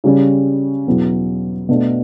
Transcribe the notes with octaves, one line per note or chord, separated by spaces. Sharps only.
C#3 G3 C#4
E2 B2 F#3
B2 A3 D4